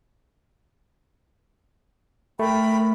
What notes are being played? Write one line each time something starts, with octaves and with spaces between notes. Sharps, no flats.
A3 A#4 G5 B5